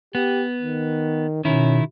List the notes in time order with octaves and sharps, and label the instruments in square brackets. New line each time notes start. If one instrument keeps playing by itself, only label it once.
[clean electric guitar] B3 [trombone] G4
[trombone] D#3
[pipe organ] B2 [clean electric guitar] D#3 E4 [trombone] C#4